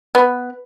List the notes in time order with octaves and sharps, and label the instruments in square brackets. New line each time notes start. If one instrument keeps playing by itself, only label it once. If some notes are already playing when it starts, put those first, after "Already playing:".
[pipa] B3